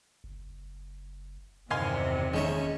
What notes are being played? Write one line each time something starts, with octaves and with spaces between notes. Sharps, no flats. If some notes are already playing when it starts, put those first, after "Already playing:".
F#1
E2 G2 C3 D#3 F5 G#5 C6
E1 D#2 G#3 C#4 C#5 E5